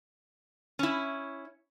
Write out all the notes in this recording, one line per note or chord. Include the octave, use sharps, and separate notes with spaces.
C#4 E4